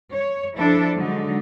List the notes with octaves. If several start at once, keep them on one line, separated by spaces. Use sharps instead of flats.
C#5
F3 D4 E4 A4
D3 F#3 G#3 D#4